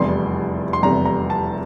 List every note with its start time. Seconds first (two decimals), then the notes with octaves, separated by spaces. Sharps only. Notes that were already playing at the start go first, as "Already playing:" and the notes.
Already playing: F1 E2 C3 G3 C6
0.73 C6
0.83 F1 E2 C3 G3 A#5
1.06 A#5
1.30 A5